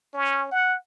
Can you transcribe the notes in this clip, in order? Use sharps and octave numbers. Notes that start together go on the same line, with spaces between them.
C#4
F#5